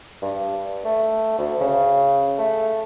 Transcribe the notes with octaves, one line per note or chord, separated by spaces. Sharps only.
G2
A3
D2
C#3
A3